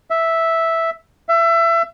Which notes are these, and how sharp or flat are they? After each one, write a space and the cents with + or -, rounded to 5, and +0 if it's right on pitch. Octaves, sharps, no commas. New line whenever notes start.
E5 -5
E5 +25